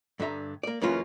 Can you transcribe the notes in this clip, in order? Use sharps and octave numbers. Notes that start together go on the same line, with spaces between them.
G2 D3 E5 A#5
A#3 D5
F#2 C#3 E3 A#3 C#4 F4